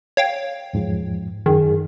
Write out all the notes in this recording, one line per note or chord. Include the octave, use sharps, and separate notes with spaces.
C#5 F5 G5
E2 G#2 F3
F#2 D#3 D#4 G#4